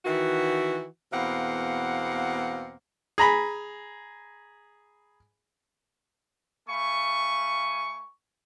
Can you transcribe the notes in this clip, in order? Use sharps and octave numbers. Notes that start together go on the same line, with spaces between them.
D#3 E3 F#4
E2 B2 A#3 C4 F5 F#5
G#4 A#5 B5
A3 F5 G#5 B5 C#6